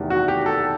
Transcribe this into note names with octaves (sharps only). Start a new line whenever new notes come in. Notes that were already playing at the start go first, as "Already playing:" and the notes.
Already playing: E2 C3 D#3 A3
F#4
G4
A4